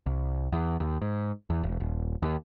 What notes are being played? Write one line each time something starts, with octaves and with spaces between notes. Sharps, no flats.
C2
E2
D#2
G#2
E2
E1
D#1
D#2